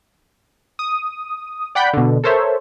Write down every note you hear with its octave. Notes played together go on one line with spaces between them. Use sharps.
D#6
D5 F#5 G5 B5 G6
B2 D3
A4 A#4 C5 C#5 E5